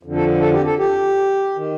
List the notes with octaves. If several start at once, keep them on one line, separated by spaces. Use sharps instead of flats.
F2 D3
A4
A4
G4
A4
G4
D#3